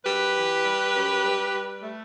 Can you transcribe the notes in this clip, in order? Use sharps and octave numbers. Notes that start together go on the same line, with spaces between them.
F#2 G4 B4
E3
G3
F#2
G3
G3
A3